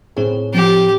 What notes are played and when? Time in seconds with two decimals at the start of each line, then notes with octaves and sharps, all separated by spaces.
0.17 A2 C4 G#4
0.54 F3 C4 G4